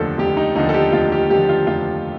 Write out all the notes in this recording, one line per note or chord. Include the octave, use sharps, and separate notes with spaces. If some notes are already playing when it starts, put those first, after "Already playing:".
Already playing: F1 D#2 D3 F3 A4
F1 G4
D#4
D#2 D3 F3 D#4
A4
G4
F1 F4
G4
D#2 D3 F3 G4
F4
F1 F4